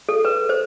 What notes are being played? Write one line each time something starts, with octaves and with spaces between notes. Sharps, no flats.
A4
B4
C5